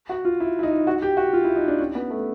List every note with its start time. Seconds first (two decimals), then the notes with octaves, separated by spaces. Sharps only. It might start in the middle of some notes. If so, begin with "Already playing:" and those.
0.09 F#4
0.25 F4
0.40 E4
0.59 E4
0.63 D#4
0.87 F#4
1.02 G4
1.17 F#4
1.33 F4
1.45 E4
1.56 D#4
1.68 D4
1.80 C#4
1.95 B3
2.10 A3